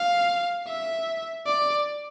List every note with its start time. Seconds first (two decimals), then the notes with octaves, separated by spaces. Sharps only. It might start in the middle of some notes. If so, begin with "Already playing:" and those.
Already playing: F5
0.67 E5
1.46 D5